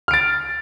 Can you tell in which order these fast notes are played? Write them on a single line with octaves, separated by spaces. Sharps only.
F6 D7 A6